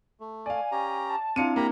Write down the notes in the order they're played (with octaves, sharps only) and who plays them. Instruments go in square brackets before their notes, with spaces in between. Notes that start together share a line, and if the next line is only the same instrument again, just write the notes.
[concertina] A3
[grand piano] D5 F5 [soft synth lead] G#5
[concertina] C#4 G4 A#5
[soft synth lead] A5
[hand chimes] C4 D4 E4 [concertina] F4 [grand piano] F5 C#7 D#7
[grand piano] A#3 [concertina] G4 A#5 B5